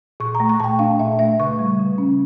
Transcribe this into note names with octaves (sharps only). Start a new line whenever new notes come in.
A#2 C#6
A#5
A3
C#6
A#2 G5 A5
D4 F5
A#2 E5
A3 E5
C#3 C#6
G3
C#3
C#4